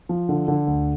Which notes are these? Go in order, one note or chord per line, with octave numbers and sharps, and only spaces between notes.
F3
D3
D3
D2